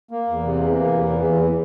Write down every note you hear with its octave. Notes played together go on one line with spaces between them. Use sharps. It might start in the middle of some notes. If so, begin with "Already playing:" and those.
A#3
E2
C3
E3
A#3
E2
E3
E2